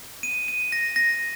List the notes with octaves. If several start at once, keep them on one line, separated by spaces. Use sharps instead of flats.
D#7
D#7
A#6
A#6